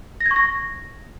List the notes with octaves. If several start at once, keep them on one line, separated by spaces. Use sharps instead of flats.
A#6
G#6
C#6
A#6